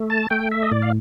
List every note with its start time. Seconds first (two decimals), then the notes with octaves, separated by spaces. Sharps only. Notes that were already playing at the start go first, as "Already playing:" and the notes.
Already playing: A3
0.10 A5
0.30 A3 G5
0.52 E5
0.63 D#5
0.71 A2 D5
0.82 F5